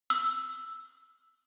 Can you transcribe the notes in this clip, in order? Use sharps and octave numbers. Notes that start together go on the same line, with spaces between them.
E6